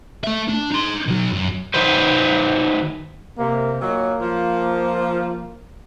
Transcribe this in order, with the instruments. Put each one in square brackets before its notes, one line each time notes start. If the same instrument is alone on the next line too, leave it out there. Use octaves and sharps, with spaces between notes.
[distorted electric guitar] A3 E5
D4
D#4 C6
B2 F#3
F#2
[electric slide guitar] D#3 F#3 B4 C5
[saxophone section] C3 [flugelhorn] A#3
[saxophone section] A#2 D#3 F#3 [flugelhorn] A#3
[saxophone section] F3